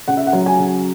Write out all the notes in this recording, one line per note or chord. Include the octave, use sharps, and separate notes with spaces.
C#3 F#5
E5
F#5
F#3
G#5
C#3